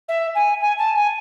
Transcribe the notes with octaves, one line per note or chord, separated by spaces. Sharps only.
E5
G#5
G#5
A5
G#5